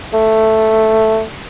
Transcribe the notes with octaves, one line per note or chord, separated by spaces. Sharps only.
A3